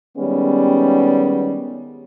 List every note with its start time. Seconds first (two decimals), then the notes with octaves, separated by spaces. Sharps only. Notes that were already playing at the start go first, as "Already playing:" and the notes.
0.18 D#3 G3 G#3 B3 C#4